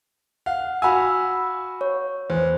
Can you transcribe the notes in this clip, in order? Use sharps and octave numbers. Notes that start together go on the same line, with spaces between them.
F5 F#5
F#4 F5 G#5 B5 E6
C#5
E2 C5